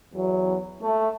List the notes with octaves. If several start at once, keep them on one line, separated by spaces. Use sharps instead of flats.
E2 F#3
A3